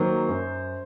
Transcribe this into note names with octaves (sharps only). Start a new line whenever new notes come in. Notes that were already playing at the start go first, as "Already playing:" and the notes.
Already playing: D#3 F#3 A#3 C5
F#2